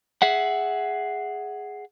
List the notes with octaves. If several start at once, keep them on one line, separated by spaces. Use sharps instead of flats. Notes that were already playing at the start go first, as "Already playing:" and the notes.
G#4 E5 F#5